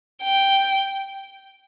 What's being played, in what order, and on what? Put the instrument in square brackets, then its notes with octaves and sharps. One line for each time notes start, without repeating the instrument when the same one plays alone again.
[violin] G5